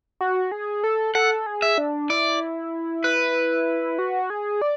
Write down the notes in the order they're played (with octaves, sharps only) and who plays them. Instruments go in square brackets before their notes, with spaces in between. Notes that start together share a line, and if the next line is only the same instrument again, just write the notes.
[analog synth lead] F#4
G#4
A4
[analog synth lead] A4 [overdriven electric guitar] F#5
[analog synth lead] G#4
[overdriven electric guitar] E5
[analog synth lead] D4
[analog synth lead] E4 [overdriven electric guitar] D5
[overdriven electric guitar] B4
[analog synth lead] F#4
G#4
D5